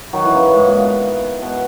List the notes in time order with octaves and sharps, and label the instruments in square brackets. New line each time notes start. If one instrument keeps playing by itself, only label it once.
[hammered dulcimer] D#3 F#3
E3
C#3
F#2
G#2
A#2
B2
B2